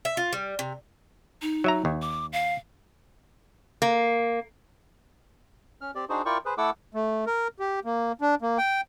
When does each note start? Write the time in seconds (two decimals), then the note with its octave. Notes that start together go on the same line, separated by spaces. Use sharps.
0.05 E5
0.17 F4
0.33 G3
0.59 C3
1.42 D#4
1.64 F#3 E5 A#5
1.85 D#2
2.02 D6
2.33 F5
3.82 A#3
5.81 C#4 F6
5.95 C4 G4 D5
6.09 D4 D#4 F#4 G#4 C5
6.25 E4 F4 A#4 D5 G5 C#6
6.45 G#4 B4 C5
6.58 A3 E4 A4 F#5 D6 E6
6.94 A3
7.27 A#4
7.60 G4
7.85 A#3
8.21 D4
8.42 A#3
8.58 G5